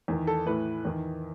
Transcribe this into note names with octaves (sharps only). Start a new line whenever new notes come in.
E2 D#3
A4
A2 E3 B4
E2 D#3